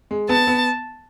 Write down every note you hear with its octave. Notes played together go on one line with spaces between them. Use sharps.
G#3
B3 A5
B3